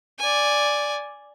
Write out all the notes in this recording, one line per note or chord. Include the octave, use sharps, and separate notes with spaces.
D5 G#5